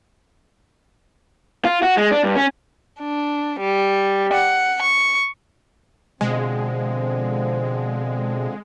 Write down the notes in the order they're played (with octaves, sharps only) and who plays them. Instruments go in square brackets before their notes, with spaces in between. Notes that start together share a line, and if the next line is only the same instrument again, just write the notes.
[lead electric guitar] F4
F#4
G#3
D4
G2
C#4
[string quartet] D4
G3
F#5
C#6
[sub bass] B2 [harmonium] D3 F3 C4 [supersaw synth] G#3